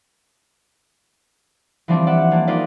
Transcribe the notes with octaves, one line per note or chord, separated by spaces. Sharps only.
E3 F3 G3 C4 D4 G4
G4 D5 E5 F#5
G3 A#3 C4 D4
D#4 F4 A#4 B4 D5